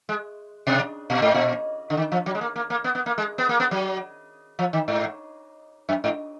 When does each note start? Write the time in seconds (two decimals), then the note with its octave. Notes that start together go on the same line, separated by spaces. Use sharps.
0.09 G#3
0.67 B2
1.10 A#2
1.22 G#2
1.34 A#2
1.90 D3
1.97 D#3
2.12 F3
2.26 F#3
2.35 G#3
2.41 A#3
2.56 A#3
2.70 A#3
2.84 B3
2.95 B3
3.06 A#3
3.18 G#3
3.38 B3
3.49 A#3
3.60 B3
3.71 F#3
4.59 F3
4.73 D#3
4.88 G#2
5.89 F#2
6.04 G#2